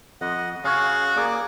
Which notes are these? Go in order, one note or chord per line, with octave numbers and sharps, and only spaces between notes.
F2 D#5 F#5
C#3 F#4 G#4 C#5 F5
A#3 G#4 D5 D6